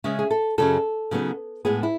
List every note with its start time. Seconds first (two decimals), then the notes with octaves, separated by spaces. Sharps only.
0.04 C#3 G#3 C#4 E5
0.19 G#4
0.31 A4
0.58 F#2 C#3 F#3 A4
1.11 C#3 F#3 B3 D#4
1.65 A2 G#3 B3 G#4
1.83 E4